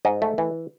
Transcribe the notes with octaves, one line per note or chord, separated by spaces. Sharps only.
G#2 D#5
A3
E3